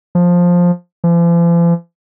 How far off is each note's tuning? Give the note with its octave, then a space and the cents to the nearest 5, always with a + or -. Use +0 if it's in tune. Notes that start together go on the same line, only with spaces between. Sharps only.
F3 +10
F3 -45